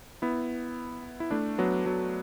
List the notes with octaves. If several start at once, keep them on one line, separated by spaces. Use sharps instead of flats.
B3 E4
E4
A3 D4
F#3 B3
F#3